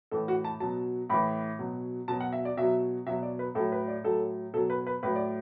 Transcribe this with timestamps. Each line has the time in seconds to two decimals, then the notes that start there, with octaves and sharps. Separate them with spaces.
0.11 A2 E3 A4
0.28 F#4
0.44 A5
0.60 B2 F#3 A5
1.10 A2 E3 B5
1.59 B2 F#3
2.08 B2 F#3 A5
2.20 F#5
2.32 E5
2.45 D5
2.57 B2 F#3 E5
3.06 B2 E5
3.09 F#3
3.23 D5
3.39 B4
3.55 A2 A4
3.58 F#3
3.72 B4
3.88 D5
4.04 A2 F#3 A4
4.53 B2 A4
4.57 F#3
4.70 B4
4.87 B4
5.03 A2 F#3 B4
5.16 D5